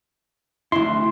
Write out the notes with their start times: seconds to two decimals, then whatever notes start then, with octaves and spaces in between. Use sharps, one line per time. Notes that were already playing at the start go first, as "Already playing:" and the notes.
0.72 D2 E4 C6